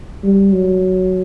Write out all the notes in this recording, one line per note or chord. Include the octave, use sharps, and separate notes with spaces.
G3
F#3